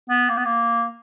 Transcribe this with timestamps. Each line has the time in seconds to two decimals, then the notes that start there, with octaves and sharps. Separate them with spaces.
0.09 B3
0.29 A#3
0.37 B3
0.45 A#3